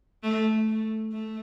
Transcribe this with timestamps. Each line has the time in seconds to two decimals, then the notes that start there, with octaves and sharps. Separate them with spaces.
0.23 A3
0.68 A3
1.12 A3